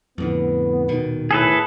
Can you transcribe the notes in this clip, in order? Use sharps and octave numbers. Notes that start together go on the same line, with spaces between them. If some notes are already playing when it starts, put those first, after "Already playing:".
F2 A2 D3 B3
D#1 B2 D#3
A2 G#4 A4 B4